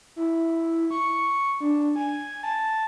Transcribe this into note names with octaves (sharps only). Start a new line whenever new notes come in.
E4
C#6
D4
G#5
A5